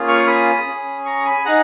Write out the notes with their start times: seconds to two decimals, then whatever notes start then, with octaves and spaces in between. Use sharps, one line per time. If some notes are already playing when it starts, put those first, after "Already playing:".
Already playing: A#3 C#4 F4 G#4
0.08 C#6 F6
0.27 B5 D#6
0.67 C#4 G#4
1.05 A#5 C#6
1.25 G#5 B5
1.45 D#4 G#4 F#5 A#5